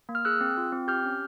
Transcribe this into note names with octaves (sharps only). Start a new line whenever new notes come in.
A#3
F6
G#4 E6 F#6
C4
F4
C4
G4 F6 G6
C#4